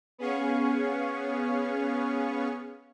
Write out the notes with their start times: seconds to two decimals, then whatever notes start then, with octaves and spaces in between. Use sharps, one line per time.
0.18 B3 C#4 G#4 C#5 F5 C#6